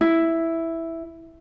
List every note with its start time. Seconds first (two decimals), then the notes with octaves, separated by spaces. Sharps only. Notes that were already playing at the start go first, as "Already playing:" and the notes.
0.01 E4